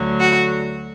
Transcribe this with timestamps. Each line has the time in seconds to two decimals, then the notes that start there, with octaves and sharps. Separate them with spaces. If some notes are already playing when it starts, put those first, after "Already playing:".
Already playing: D2 D3 F#3
0.19 F#4